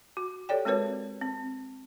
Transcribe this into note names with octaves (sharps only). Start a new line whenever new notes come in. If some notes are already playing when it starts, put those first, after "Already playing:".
F#4
G4 A4 C#5 D5 G5
G#3 C4 F#4 A#4 B4 C#5
C4